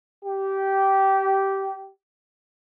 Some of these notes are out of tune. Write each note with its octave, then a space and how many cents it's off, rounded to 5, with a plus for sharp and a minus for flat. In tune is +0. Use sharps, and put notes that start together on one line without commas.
G4 -15